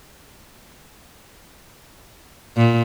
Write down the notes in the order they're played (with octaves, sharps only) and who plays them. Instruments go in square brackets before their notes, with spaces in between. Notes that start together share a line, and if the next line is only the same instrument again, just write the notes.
[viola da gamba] A#2